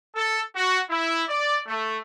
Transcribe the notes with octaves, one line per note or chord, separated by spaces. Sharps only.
A4
F#4
E4
D5
A3